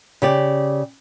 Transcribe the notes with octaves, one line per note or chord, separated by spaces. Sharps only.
C#3 G4 D5